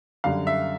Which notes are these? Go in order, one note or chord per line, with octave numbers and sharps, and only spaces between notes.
F#2 D3 G3 F5
E5